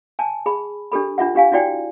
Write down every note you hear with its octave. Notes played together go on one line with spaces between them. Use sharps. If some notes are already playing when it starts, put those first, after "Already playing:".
G#5 A5
G#4 B5
D4 G4 A4 B5
D4 F4 E5 F#5
D4 G4 F5 G#5
D4 E4 F#4 D5 G5 G#5